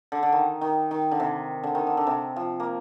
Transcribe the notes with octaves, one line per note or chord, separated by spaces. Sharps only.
D3
D3
D#3
D#3
D#3
D3
C3
D3
D#3
D3
D3
C3
F3
A#3